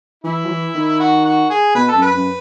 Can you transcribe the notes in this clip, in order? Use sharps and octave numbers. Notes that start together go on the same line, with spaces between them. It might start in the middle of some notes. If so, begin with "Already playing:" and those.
E3 E4
F#3
E3
D#3
F#4
F#4
G#4
B2 B4
A4
F#2
B4
F#2